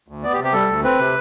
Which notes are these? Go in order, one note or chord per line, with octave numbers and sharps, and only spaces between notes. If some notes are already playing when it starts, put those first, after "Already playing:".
D2
B3 D5
G4
C3
G4
G3 A4
D2
C4 B4
C3